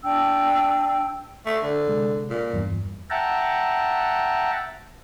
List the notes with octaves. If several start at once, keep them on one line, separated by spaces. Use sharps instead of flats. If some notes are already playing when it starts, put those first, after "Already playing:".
D4 G5 E6
A3
D3
C3 G#3
A#2
E2 G2
E5 F#5 G5 A5 A#5